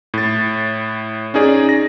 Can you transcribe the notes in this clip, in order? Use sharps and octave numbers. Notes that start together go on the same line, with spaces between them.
A2 A6
C#4 D#4 G#4 D5
A#6